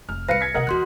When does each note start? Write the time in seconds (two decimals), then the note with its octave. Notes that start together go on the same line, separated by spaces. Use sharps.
0.09 F1 F6
0.29 C2 G3 B4 F5 A#6 C#7
0.41 G#6 B6
0.54 C3 D#4 A#4 D#5 F#5
0.67 D#2 E3 F#4 C6 F#6